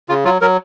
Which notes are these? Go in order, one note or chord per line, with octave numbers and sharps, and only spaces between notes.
C#3 F4
F#3 F4
F#3 A#4